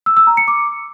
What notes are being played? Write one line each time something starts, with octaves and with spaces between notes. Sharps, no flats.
E6
E6
A#5
C#7
D6